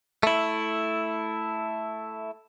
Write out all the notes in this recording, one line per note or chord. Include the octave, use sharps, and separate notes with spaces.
A3 E4